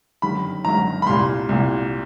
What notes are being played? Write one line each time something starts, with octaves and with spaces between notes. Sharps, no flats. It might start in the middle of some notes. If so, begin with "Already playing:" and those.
G1 F#2 D#3 B5
G1 F#2 D#3 A#5
B5
C2 A#2 C6
C2 A#2